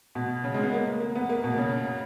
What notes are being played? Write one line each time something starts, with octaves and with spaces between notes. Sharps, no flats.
B2
C#3
G#3
B3
A#3
A#3
B3
A#3
B2
C#3